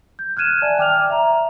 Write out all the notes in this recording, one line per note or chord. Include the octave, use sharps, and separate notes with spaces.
G6
F6 F#6 G#6 D#7 E7
D5 E5 G#5 A5
G5 D6 F6 F7
E5 A#5